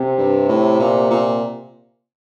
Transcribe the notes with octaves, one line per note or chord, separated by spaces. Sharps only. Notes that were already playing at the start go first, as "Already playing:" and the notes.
Already playing: C3
G2
A2
A#2
A#2